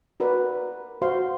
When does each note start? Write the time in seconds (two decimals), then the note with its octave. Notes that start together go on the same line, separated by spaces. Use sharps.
0.20 F#4 A#4 B4 D5
1.02 F#4 C5 F5 C6